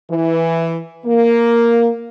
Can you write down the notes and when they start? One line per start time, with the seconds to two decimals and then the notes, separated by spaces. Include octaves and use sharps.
0.10 E3
1.05 A#3